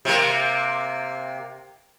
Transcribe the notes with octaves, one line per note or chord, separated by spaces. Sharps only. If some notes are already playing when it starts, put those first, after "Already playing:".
C3 A#3